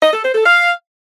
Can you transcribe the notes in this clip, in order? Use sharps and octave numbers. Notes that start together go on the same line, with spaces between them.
D#5
A4
C5
A4
F5